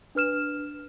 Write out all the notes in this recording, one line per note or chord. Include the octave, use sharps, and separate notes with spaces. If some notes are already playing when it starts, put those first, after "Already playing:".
D4 B4 F6 E7